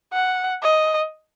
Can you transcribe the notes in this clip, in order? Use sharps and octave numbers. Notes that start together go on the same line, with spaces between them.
F#5
D#5